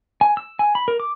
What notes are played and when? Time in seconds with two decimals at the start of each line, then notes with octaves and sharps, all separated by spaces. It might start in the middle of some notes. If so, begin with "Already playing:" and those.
0.21 G#5
0.37 E6
0.59 G#5
0.75 B5
0.88 A#4
1.00 D6